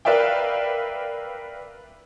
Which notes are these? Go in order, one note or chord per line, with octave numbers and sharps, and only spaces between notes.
A#4 B4 D5 E5 F5 G5